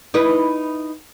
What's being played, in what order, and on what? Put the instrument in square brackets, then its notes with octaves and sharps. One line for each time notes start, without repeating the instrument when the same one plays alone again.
[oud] D#4 E4 B4